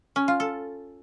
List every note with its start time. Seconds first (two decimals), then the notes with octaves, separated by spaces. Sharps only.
0.16 C#4
0.28 F4
0.40 A4